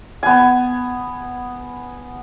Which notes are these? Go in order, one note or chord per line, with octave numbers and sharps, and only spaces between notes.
B3 G#5